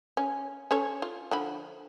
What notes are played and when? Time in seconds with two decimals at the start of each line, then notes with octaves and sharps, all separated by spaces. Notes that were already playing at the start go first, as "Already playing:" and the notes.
0.17 C#4
0.71 C#4 A4 C#5
1.02 F4
1.31 D3 F3 B5